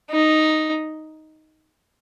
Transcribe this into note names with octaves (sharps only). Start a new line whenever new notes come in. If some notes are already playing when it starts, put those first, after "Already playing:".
D#4